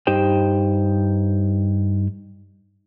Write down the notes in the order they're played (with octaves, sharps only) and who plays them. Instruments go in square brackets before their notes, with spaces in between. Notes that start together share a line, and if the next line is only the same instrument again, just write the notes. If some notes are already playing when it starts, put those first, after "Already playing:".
[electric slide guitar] G2 D#4 G4 C5 G5